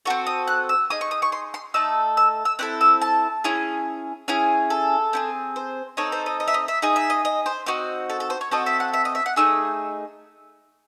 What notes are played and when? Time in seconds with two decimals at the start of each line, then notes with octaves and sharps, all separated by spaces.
0.05 C4 F#4 A4 C#6
0.27 D#6
0.47 F#6
0.69 E6
0.90 D#4 G#4 D#6
1.01 C#6
1.11 D#6
1.22 C#6
1.32 C6
1.54 C6
1.74 A3 D#4 A4 E6
2.17 E6
2.45 E6
2.59 C4 E4 A4 F#6
2.81 E6
3.01 A5
3.44 C#4 E4 G#4
4.28 C#4 E4 G#4
4.70 A4
5.13 C4 E4 G#4
5.56 C5
5.97 C4 D#4 A4 C#5
6.12 C5
6.26 D#5
6.40 D#5
6.48 E5
6.54 D#5
6.68 E5
6.82 D#4 G#4 D#5
6.96 E5
7.10 D#5
7.25 D#5
7.46 C5
7.66 C4 D#4 F#4
8.10 A4
8.20 A4
8.30 C5
8.41 C#5
8.51 C4 F#4 A4 D#5
8.66 E5
8.80 F#5
8.93 E5
9.05 D#5
9.15 E5
9.26 F#5
9.36 A3 D#4 G#4 E6